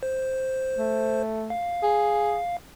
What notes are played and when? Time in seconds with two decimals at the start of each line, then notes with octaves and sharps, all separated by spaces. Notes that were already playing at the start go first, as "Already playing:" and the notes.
0.03 C5
0.78 A3
1.50 F5
1.83 G#4